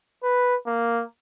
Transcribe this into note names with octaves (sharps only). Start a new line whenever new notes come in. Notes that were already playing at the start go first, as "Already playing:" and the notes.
B4
A#3